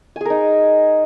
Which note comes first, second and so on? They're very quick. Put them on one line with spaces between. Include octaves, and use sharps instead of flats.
G#5 G#4 A#4 D#4